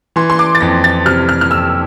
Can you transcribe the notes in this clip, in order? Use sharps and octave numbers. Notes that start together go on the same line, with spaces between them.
E3 C6
C6
D6
A6
F2 A#6
A6
C3 F6
F6
F6
F2 E6